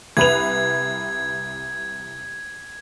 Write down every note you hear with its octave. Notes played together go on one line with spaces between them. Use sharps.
C2 B4 G#6 F7